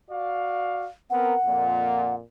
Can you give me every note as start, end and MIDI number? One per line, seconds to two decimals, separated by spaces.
0.10 0.87 66
0.10 0.87 74
0.10 0.87 77
1.10 1.34 59
1.10 1.34 60
1.10 1.34 70
1.10 2.15 78
1.45 2.20 41
1.45 2.20 46